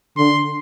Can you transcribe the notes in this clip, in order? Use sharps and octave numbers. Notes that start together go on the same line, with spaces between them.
D3 C6